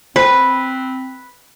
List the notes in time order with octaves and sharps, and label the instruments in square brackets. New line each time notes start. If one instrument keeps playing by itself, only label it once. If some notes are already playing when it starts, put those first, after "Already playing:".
[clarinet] C4 [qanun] B4 [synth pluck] C5